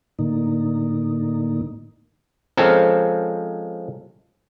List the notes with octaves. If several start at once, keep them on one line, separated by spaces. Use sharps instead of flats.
A2 D3 A#3 D#4
F3 G#3 C4 C#4 A4 A#4